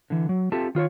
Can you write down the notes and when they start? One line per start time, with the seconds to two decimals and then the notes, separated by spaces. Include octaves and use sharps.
0.10 D3 E3
0.29 F#3
0.52 C4 F4 G4 A4 E5 A5
0.75 D#3 F4 C5 C#5